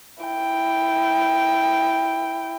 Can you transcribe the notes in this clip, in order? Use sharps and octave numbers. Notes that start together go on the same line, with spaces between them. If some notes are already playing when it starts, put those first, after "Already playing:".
E4 G5